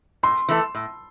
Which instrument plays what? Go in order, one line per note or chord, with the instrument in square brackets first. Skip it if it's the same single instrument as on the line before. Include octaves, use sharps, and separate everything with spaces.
[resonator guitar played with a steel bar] A2 [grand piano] C6
[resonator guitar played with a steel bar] E3 A3 E4 A4
A2